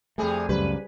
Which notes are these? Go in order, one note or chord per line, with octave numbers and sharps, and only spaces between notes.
F2 C3 G3 A3 G#4
C#2 F#2 G3 G4 B4 D5